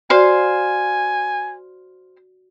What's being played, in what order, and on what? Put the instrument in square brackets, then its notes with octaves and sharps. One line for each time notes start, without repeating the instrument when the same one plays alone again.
[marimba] F#4 D5 [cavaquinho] C5 F5 [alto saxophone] G#5